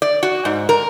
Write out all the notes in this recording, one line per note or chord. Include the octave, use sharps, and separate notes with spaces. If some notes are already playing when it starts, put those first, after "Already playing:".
D5
F#4
G#2
A#4